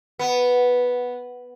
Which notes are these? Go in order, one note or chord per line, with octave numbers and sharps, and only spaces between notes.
B3